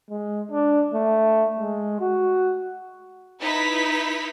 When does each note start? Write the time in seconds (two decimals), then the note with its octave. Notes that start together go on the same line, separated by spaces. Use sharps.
0.10 G#3
0.51 D4
0.94 A3
1.60 G#3
2.00 F#4
3.40 D#4 E4 B4 B6